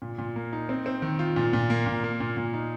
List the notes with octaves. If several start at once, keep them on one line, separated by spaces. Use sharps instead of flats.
A#2
A#2
A#3
D#4
C4
C4
D#3
F4
A#2
A#2
A#3
A#2
A#3
A#2
A#2
D#4